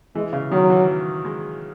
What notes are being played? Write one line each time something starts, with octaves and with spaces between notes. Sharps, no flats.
E3 G#3
C#3
D#3 F#3
E3
F#3
G#3